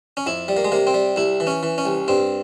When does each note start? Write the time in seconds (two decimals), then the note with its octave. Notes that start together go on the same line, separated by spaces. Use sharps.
0.17 C#4
0.26 F2 E4
0.48 G3
0.57 A#3
0.65 G#3
0.72 C3 A#3
0.87 C4
0.94 G3
1.16 C2 E4
1.40 E3
1.47 C#4
1.63 E3
1.78 C#4
1.85 C2
2.08 G2 C4